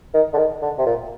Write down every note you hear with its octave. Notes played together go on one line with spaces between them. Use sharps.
D#3
D3
D#3
D3
C3
A#2